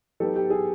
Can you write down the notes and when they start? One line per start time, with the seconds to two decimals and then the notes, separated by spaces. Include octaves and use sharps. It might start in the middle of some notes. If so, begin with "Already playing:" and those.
0.20 F#3 B3 D#4 G4 A4
0.36 G4
0.50 G#4